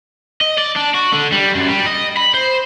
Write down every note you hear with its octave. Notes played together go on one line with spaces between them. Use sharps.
D#5
D5
D4
F#4
D3
G3
F#2
G3
D#5
B5
C5